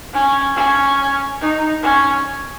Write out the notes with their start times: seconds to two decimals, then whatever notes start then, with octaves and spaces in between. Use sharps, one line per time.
0.14 C#4
0.56 C#4
1.41 D#4
1.83 C#4